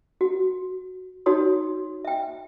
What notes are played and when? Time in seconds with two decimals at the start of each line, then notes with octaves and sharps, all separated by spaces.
0.21 F#4
1.26 D#4 F#4 C#5 C6 D#6
2.05 E5 G5